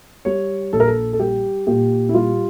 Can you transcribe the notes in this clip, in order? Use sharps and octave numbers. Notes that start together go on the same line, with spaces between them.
G3 C#5
A#1 A4
A#4
A4
A4
G3 G4
A#2 G4
E4
G3 F4